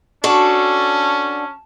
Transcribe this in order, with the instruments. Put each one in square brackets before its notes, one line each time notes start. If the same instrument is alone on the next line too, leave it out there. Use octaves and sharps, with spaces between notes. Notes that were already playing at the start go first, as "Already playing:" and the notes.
[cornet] C#4 [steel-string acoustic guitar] D4 F#4 A4 [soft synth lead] A5